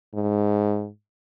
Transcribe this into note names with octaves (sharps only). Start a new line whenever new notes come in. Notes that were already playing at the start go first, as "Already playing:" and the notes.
G#2